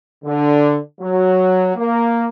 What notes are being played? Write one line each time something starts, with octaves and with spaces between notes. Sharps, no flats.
D3
F#3
A#3